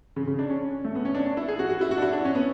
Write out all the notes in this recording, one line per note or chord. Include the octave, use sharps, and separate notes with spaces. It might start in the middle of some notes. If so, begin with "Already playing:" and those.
C#3
C#3
D4
C#4
A3
B3
C#4
D4
D4
E4
G#4
F#4
F#4
E4
F#4
D4
E4
D4
C#4
B3